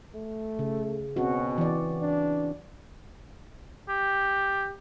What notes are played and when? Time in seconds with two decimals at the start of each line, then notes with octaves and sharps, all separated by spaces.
0.15 A3
0.59 C#3
1.16 B2 C4 C#4 F#4
1.58 E3 D5
2.02 D4
3.89 G4